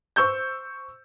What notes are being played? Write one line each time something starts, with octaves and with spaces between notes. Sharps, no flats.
C5 C#6 E6 G6